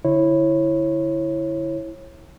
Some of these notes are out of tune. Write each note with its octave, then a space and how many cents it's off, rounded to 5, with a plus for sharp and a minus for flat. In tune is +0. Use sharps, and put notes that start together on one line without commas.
D3 -5 E4 +0 C#5 -30